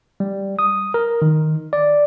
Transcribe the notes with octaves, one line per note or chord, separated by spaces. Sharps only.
G3
D#6
A#4
D#3
D5